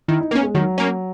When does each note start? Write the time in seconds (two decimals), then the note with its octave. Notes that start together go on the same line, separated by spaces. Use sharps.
0.08 D#3 E4
0.20 D#4
0.31 A#3 B3 C#4
0.43 G#3
0.55 D#3 F#3
0.78 A#3 C#4